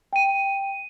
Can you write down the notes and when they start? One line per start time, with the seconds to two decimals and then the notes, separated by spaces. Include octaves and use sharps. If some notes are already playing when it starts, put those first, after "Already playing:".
0.13 G5 D#7